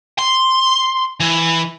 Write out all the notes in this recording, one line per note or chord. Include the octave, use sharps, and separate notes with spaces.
C6
E3